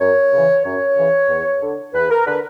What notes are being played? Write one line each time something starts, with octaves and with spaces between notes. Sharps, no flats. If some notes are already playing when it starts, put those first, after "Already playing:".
F#2 C#5
C#3
E3
F#2 C#5
C#3 E3
E2
D3
E2 B4
A#4
D3 B4